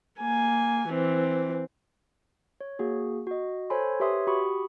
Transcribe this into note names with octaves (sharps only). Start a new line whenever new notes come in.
A#3 G#5
E3 C4
C#5
A#3 F#4 G#4
F#4 D#5
A4 C5 C#5 G#5 B5 C6
G4 B4 C#5 E5 C6 D#6
F#4 G4 B5 C#6 D#6